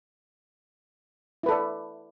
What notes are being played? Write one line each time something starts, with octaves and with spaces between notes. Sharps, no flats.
E4 A4 B4 D5